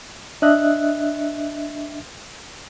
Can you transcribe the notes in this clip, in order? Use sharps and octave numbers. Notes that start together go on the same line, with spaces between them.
D4 D#5 E5 F#6